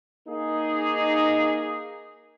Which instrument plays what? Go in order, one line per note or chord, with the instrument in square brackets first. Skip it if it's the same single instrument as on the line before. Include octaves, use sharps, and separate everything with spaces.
[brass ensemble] A#3 D#4 G#4